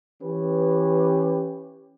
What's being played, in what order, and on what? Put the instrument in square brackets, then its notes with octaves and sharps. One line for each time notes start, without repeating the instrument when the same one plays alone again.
[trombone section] E3 C#4 G4 B4